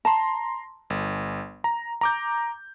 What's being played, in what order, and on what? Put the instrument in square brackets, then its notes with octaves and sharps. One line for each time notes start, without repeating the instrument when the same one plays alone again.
[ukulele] A5 [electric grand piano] A#5 C6
[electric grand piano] G1
A#5
A#5 D6 G6